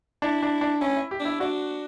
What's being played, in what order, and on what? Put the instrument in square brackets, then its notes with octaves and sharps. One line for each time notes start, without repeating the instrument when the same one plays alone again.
[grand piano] D4 [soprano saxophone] E4
[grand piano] D4
D4
[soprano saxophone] C#4 [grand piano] E4
[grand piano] E4
G4
[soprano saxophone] D4
[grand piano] E4
[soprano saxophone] D4 [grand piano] F#4